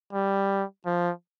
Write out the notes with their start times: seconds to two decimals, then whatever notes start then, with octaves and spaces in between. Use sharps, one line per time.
0.13 G3
0.86 F3